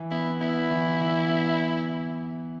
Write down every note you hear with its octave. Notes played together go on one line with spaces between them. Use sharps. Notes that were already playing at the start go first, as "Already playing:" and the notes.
Already playing: E3
B3 E4
B3 E4
E3
E3
B3